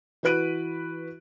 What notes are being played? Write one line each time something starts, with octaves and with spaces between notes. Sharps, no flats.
E3 F#4 B4 F#6 D7 D#7